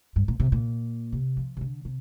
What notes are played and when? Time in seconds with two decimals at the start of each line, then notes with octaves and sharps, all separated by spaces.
0.16 G2
0.28 A#2
0.40 C3
0.52 A#2
1.12 C3
1.37 F3
1.57 C3
1.61 D3
1.85 C3